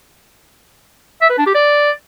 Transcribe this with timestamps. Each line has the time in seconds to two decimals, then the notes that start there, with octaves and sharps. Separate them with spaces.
1.21 E5
1.30 B4
1.38 D4
1.46 G4
1.55 D5